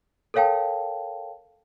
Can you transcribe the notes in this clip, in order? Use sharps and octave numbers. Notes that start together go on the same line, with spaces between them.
A4 A#4 C#5 F5 G5 A5